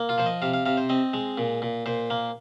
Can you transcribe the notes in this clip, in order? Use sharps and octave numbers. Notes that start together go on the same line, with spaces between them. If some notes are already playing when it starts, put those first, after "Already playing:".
Already playing: A#3
F4
F3 C5
D#5
C3 F5
F5
C3 F5
C5
C4 D#5
G#3
A#2
A#2
A#2 C5
A#3